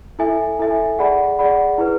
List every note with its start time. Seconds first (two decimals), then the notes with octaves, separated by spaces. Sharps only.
0.19 E4 A4 E5 G#5
0.59 E4 A4 E5 G#5
0.99 G#4 D5 F#5 B5
1.39 G#4 D5 F#5 B5
1.78 E4 G#4 B4